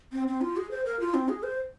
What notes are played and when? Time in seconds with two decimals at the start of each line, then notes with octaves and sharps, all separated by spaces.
0.12 C4
0.27 C4
0.41 F4
0.57 G#4
0.71 C5
0.85 A#4
1.00 F4
1.14 C4
1.29 G#4
1.43 C5